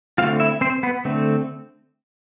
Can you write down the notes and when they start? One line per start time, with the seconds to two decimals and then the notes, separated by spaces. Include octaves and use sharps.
0.18 D3 A3 C4 F4 F5
0.40 E4 E5
0.61 C4 C5
0.83 B3 B4
1.05 D3 A3 C4